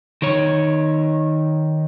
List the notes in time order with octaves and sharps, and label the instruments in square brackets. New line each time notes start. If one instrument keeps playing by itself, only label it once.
[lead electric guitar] D#3 C#5